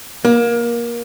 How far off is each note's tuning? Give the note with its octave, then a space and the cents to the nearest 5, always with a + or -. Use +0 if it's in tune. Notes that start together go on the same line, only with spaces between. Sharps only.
A#3 +20